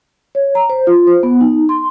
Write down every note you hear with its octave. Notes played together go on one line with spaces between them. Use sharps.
C#5
A#5
C5
F4
C5
B3
D#4
C6